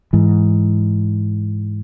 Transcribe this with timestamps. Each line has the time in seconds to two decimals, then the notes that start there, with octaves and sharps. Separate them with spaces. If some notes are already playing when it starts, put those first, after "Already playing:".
0.13 G#2 E3